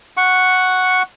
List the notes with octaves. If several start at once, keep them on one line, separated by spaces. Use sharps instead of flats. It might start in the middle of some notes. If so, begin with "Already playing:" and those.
F#5 C#6